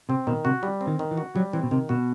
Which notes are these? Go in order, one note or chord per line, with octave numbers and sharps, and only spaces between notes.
C3 C4
B2 D#3
C3 F#4
G3
C4
D#3
D#3
E3
F#4
F#3 G3
E3 C4
B2
C3 D#3
B2 F#4